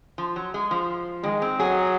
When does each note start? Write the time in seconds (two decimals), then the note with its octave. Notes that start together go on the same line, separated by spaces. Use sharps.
0.18 F3
0.36 F#3
0.54 G#3
0.71 F3
1.23 D#3 G#3
1.42 C4
1.59 F#3 G#4